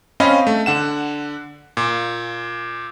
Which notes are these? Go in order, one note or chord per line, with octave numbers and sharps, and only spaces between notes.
C4 C#4 D#5 F5 B5
A3
D3 F#5 E7
A#2